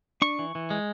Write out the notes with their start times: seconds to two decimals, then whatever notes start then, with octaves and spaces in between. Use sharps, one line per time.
0.22 D4 C#6
0.39 E3
0.55 E3
0.70 G#3